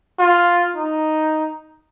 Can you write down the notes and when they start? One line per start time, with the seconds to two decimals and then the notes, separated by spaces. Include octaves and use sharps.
0.19 F4
0.76 D#4